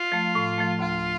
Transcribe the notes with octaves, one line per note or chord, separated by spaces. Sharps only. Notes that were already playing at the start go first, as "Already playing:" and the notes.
Already playing: F4
F3 A3
A2
F3 A3
D2 F4